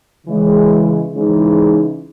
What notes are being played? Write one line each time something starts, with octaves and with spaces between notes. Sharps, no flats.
C#3 E3 G#3
C#3 E3 G#3 D#4